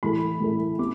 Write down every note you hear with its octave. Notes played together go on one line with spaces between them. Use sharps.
A2 E3 A3 B5
A2 E3 A3
B3 D6